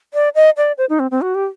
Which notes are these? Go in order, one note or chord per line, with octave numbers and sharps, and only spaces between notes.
D5
D#5
D5
C5
D#4
C4
C4
F#4
G4